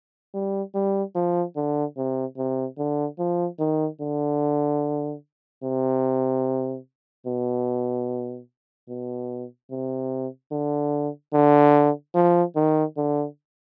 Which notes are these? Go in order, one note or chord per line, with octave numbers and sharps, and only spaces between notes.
G3
G3
F3
D3
C3
C3
D3
F3
D#3
D3
C3
B2
B2
C3
D3
D3
F3
D#3
D3